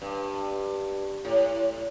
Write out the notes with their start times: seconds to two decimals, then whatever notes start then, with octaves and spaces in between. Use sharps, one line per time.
0.02 G2
1.25 A2